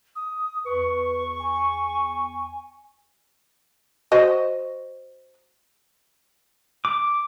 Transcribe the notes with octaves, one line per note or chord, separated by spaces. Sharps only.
D#6
E2 B4 C#6
G#5
F#4 C5 D#5
D6